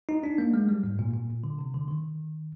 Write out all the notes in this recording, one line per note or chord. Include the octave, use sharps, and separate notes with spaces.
D#4
D4
A#3
G#3
G3
G#2
A#2
A#2
D3
C3
D3
D#3